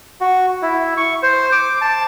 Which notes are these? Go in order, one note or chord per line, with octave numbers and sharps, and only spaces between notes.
F#4
E4
C#6
C5
D6
A5